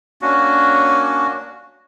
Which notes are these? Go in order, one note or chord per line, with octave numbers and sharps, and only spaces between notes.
A#3 C#4 D4 F#4